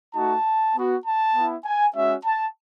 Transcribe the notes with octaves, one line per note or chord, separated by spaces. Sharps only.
A3 D#4 F#4 A5
B3 F#4
A5
B3 E4
G#5
G#3 C#4 F#4 E5
A5